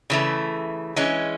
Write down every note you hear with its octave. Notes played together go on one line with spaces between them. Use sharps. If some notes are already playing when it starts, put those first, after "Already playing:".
C#3 E3 A3
E3 G#3 C#4